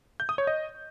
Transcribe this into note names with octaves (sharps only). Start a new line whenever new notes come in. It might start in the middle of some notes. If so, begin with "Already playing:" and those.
G6
D#6
C#5
D#5